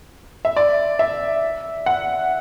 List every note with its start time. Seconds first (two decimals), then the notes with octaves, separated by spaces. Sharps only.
0.45 E5
0.56 D5
0.99 E5
1.86 F#5